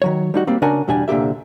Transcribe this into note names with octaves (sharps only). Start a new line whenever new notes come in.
D#3 F#3 C#5
G3 D#4 F#4
G3 A#3 C4
C#3 D4 F#4 A#4 F#5 G#5
E2 B2 G3 D4 G#5
C2 A#2 D3 G4 E5